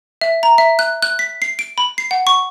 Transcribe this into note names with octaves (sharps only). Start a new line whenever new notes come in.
E5
A#5
E5
F#6
F#6
B6
C7
D7
B5
C7
F#5
C#6